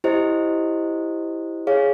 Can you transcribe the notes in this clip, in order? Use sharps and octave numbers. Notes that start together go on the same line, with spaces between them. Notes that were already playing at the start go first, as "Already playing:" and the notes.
E4 G4 C5 D#5
G#4 C#5 F5